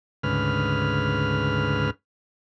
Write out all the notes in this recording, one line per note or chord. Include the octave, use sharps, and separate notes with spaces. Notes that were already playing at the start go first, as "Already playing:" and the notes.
D2 G#2 C#3 B4 F6